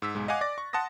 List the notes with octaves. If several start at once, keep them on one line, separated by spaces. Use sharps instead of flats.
G#2 E6 B6
B1 G#2 G#3
D#5 F5 F#5 G#5 D6 F#6
D5 D6 A6 A#6
C#6
F#5 A5 C6 D#6 A#6